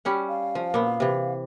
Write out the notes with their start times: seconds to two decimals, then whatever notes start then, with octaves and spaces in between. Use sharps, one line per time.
0.05 G3 C#4 F#5
0.28 F5
0.55 F3
0.74 A#2 B3
1.00 C3 E3